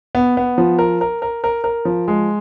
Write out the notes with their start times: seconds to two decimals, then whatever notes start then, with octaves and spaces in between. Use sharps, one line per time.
0.15 B3
0.37 B3
0.58 F3
0.79 A#4
1.01 A#4
1.22 A#4
1.44 A#4
1.64 A#4
1.85 F3
2.08 G#3